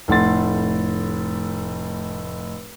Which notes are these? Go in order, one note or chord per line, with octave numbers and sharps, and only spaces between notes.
F1 A2 F#5 C6 A6